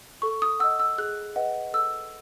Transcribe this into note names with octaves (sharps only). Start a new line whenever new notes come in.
A4 C#6
D#6
D#5 F#5 E6
E6
G#4 F#6
B4 D#5 F#5
A4 E6